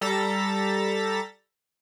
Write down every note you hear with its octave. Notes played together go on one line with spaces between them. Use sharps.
G3 A4 A#5 A6 B6